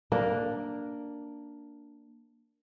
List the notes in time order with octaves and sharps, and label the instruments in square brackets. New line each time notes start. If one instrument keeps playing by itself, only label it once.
[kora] A#3 D4 A#4